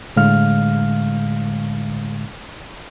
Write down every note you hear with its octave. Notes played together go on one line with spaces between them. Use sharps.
A2 D3 G#3 F5 F6